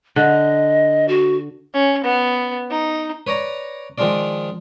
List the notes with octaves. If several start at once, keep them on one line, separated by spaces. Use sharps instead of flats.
D3 D#5
F#4
C#4
B3
D#4
B4 C#5 D5 A#5
D#3 F3 G#3 D4 F4 D5